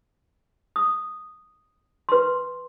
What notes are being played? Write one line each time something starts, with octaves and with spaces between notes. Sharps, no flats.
D#6
B4 C6